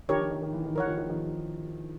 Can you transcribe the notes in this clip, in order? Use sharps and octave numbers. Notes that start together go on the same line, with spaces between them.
D#3 F3 D4 G4 A#4 C#5
D#3
D#3
D#3
E3
D#3
E3 A#4 C#5 F#5
D#3 F3
D#3 F3
D#3 F3